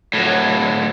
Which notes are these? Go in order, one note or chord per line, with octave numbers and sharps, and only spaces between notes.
A2 F#3